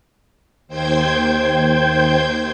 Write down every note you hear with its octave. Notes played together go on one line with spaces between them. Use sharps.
D#2 C5 G5 G6 G#6